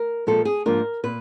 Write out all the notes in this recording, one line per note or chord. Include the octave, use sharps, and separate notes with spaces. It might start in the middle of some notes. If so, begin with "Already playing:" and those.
Already playing: A#4
A#2 F3 G#3 A4
G#4
G#2 F3 A#3 D4 F4 A#4
A#2 B4